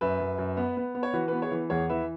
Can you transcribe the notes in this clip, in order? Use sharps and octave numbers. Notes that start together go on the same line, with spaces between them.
F#2 B4 E5
F#2
F#2
B3
B3
B3
C#5
E3 F#4 B4
B3 F#4 B4
G#4 C#5
E3
E2 G#4 C#5
E3 B4 E5